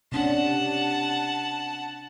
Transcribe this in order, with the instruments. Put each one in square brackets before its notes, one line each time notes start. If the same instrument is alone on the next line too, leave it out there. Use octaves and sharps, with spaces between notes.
[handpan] C3 C#4 D4 [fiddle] F#5 A5